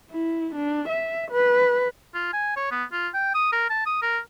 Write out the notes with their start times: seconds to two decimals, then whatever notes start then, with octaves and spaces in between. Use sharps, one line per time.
0.11 E4
0.55 D4
0.89 E5
1.31 B4
2.14 F4
2.33 G#5
2.56 C#5
2.71 B3
2.92 F4
3.14 G5
3.34 D#6
3.52 A#4
3.70 A5
3.86 D#6
4.02 A#4